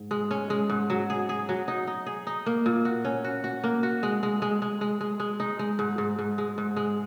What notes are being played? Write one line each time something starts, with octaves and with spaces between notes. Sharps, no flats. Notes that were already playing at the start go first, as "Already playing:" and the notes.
Already playing: G#2
G#3
C#4
G#3
G#2
F#3
G#4
G#4
F#3
D#4
D#4
G#4
D#4
A#3
A#2
F#4
C#4
F#4
F#4
A#3
F#4
G#3
G#3
G#3
G#3
G#3
G#3
G#3
D#4
G#3
G#2
G#2
G#2
G#3
G#2
G#3